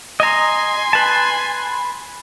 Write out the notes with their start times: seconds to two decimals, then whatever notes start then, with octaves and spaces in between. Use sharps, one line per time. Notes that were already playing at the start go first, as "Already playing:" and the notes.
0.20 D#5 G#5 A#5 C6
0.93 B4 A5